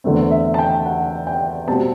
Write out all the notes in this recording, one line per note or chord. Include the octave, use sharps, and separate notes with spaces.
E2 D3 A3 C4
E5
A5
G5
F#5
G5
B2 G3 C4 A5